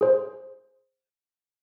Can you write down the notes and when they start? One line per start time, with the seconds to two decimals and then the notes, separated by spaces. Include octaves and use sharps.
0.01 G#4 C5